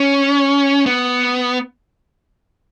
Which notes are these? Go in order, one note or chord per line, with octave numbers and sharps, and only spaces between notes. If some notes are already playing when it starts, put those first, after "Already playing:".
Already playing: C#4
B3